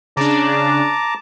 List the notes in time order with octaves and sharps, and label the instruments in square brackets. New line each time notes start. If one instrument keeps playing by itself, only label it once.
[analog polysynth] C#3 D4 [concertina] A5 A#5 D6